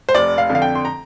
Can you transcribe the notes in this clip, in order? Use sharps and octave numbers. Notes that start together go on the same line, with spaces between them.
C5
F1 D5
F5
F2 D3
F5
G5
C6
A#5